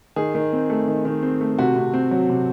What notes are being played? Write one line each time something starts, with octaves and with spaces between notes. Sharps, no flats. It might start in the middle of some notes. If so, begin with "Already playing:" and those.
D#3 G#4
D#3
C4
A3
D#3
D#3
C4
A3
C3 F#4
C3
C4
F#3
C3